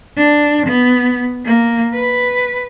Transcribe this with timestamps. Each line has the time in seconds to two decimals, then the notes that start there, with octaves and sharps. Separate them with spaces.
0.17 D4
0.66 B3
1.45 A#3
1.94 B4